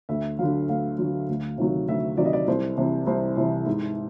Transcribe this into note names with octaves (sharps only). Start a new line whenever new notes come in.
D2 E5
D3 F#3 F5
D2 F5
D3 F#3
D2
C3 D#3 F#3
D2 E5
C3 D#3 F#3 D5
D#5
D5
C2 C5
C3 E3
C2 C5
C3 E3
G#2